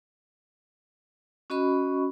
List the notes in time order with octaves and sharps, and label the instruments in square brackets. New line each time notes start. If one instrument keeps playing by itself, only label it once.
[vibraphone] C#4 F#4 D#5 B5 C#6